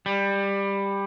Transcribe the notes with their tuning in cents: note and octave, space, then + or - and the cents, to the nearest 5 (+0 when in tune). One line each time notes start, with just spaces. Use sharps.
G3 +15